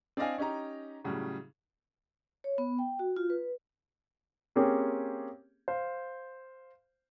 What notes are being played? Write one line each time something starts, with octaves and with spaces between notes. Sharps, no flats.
C4 D4 D5 D#5 F5 G#5
C#4 D#4 G4 A#5
A2 C#3 F#3 G3
C#5
B3
G5
F#4
F4
B4
A#3 C4 C#4 G4 G#4 A#4
C5 F5